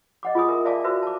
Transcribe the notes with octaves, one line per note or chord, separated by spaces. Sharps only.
D#5 F#5 D6
F4 G#4 G#5 D#6
A#4 E5
D5 E5 F5 G#5 A5 D6
F#4 B4 C5 E5
A5 D6